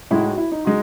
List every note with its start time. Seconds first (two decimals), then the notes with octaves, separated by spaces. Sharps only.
0.11 A2 G#3 D#4 E4 F#4
0.32 F#4
0.37 E4
0.52 D#4
0.65 G#3 D#4 F#4